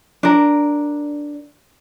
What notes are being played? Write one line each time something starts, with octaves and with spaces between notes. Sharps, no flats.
D4 A#4